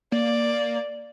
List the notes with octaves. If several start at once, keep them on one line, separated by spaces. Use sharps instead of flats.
A#3 D5